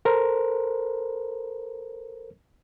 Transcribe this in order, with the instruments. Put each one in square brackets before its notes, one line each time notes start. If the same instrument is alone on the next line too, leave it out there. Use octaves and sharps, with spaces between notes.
[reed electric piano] A4 A#4 C5